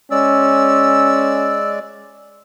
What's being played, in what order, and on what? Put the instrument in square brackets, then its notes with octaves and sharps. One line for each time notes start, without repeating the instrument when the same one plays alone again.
[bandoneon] G#3 D5 [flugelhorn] C#4 [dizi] E6